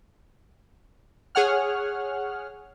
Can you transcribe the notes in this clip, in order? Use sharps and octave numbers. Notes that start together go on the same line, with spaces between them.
G#4 C#5 F#5 F6